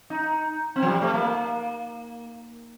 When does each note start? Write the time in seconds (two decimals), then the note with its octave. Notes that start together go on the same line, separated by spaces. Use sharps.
0.10 D#4
0.76 C4
0.82 F3
0.88 G3
1.02 A3
1.14 A#3